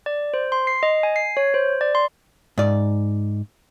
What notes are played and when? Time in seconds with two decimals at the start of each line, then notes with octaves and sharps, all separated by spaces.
0.06 D5
0.34 C5
0.52 C6
0.67 C7
0.83 D#5
1.03 G#5
1.16 C7
1.37 C#5
1.54 C5
1.81 D5
1.95 C6
2.58 G#2 D5